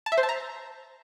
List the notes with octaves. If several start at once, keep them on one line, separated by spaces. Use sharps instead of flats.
A5
E5
C5
A5
A#5